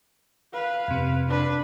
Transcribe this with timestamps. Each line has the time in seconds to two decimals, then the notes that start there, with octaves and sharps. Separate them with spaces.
0.53 B4 F5
0.88 F2 C3
1.28 D4 B4